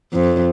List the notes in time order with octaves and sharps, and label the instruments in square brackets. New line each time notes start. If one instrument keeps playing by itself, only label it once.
[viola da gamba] F2